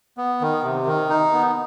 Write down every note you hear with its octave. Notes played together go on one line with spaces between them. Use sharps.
B3
D#3
C3
D#3
D#4
B3